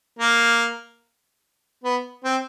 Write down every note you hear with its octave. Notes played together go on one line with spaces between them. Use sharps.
A#3
B3
C4